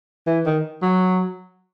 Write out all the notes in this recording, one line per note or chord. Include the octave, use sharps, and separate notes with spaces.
E3
D#3
F#3